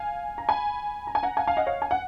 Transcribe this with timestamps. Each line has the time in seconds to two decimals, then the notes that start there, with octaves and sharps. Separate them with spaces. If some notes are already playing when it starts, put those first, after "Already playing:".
Already playing: F5 G#5
0.38 A#5
0.49 G#5 B5
1.07 A#5
1.15 G#5
1.23 F#5 A#5
1.37 F5 G#5
1.47 F5 G#5
1.57 D#5 F#5
1.67 C#5 F5
1.82 G#5
1.91 F#5